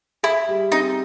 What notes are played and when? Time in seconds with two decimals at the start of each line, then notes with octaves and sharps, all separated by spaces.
0.23 E4 G#4
0.48 G3
0.71 C4 D#4